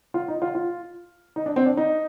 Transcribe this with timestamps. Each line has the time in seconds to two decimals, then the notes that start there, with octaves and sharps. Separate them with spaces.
0.14 F4
0.28 D#4
0.42 F4
0.55 F4
1.36 D#4
1.46 D4
1.56 C4
1.66 D4
1.77 D#4